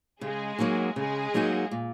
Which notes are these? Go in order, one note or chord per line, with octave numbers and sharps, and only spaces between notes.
C#3 G#3 G#4
F#3 A#3 D#4 F#4
C#3 G#3 G#4
F#3 A#3 D#4 F#4
A#2